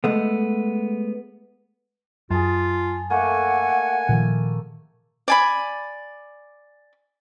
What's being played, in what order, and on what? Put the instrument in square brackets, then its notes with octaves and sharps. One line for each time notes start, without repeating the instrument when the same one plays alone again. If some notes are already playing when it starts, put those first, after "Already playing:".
[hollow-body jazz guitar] G#3 A3 B3
[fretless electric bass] F#2 [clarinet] F4 [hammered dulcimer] G#4 A5
[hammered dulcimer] A3 A#3 [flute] F#5 [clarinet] G#5
[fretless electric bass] A#2 D#3 F3
[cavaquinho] D5 G#5 B5